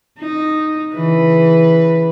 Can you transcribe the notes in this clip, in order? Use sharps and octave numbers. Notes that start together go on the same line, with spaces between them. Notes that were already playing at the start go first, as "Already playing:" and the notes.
D#4
C#3 E3 B4